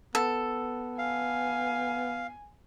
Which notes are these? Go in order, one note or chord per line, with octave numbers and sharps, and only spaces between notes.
B3 A4
F5 G#5